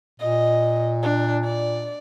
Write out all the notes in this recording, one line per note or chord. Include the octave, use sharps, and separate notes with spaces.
A#2 D#5
D4
D5